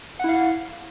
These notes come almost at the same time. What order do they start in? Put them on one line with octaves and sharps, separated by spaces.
F#5 E4 F5